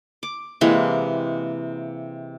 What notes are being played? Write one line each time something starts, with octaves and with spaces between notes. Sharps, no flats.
D6
C3 E3 G#3 A#3